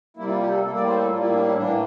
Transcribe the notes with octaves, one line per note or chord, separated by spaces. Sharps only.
C3 G3 A#3 E4
F4
G4
A4
A2 G3 A#3 A4
D5
C5
A4
A2 G3 A#3 F4
E4
D4
E4
A2 E3 A#3 D4